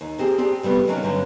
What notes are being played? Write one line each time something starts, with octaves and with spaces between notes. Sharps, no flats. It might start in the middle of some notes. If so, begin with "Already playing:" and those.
D#2
A#3 C4 G4 G#4
C4 D4 G4 G#4
C3 G3 A3 B3
C3 F#3 A#3 C#4 D#4
G2 D3 F#3 A#3 C#4